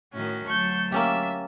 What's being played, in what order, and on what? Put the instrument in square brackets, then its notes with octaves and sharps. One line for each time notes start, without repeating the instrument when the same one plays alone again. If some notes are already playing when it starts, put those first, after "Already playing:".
[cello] A2 D#3 [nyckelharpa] C#4 F#4
[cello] D2 F#3 [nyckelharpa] A5 [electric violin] C#6 G6
[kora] A#3 C#4 G4 [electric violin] E5 B6